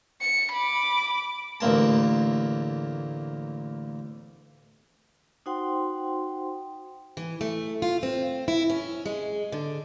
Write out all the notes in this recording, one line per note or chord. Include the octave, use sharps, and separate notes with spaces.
C#7
B5 D6
A1 D2 A#3 A5
D#4 F#4 C5 F#5 G5 C6
E3
A3
F4
C4
E4
C#4
G#3
D3